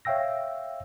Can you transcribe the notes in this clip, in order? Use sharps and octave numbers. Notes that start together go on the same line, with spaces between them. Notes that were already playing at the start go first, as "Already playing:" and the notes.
C#5 E5 F5 G5 E6 A#6